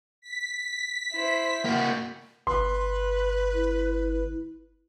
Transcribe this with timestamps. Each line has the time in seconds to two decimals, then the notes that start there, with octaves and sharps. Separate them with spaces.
0.21 B6
1.13 E4 C5
1.65 A#3 F#4 G5
2.47 G1 B4 C6
3.54 E4